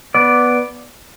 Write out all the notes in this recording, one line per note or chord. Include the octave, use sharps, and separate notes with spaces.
B3 D5